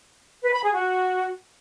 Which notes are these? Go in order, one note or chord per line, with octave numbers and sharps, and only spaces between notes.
B4
B5
G#4
F#4